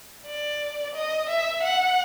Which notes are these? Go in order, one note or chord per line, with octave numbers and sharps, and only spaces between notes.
D5
D#5
E5
F#5